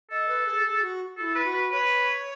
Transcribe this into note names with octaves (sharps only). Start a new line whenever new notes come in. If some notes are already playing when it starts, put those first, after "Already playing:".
A4 D#5
B4
G#4
G#4
F#4
E4 F#4 A4
B4
F#4
B4
B4 C#5